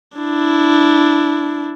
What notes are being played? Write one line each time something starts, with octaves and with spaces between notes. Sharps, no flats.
D4 E4